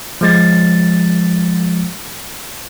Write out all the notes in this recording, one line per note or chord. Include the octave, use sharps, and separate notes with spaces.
F3 G#3 A6